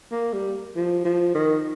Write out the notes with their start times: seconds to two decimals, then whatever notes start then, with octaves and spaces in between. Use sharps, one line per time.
0.11 A#3
0.33 G3
0.76 F3
1.05 F3
1.34 D#3